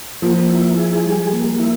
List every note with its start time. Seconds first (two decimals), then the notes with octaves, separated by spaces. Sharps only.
0.22 F3 A#3
0.49 E4
0.77 G#4
1.05 G3
1.32 A#3
1.59 E4